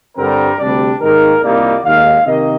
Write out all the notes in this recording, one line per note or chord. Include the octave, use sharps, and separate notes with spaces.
G2 D3 G3 C4 A#4
D2 C3 G3 D4 D5
G#2 D#3 A#3 A#4
C2 A#2 G3 A#3 D#4 D5
D#2 D#3 G#3 F5
C3 D#3 A#3 D#5